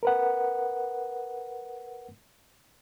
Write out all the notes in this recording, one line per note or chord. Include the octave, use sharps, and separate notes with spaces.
A#4 B4 F#5